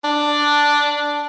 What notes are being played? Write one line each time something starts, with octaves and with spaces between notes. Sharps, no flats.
D4